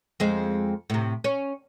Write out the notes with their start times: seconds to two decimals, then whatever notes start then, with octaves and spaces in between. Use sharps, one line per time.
0.20 F2 G#3 C4
0.90 A2 C3
1.24 C#4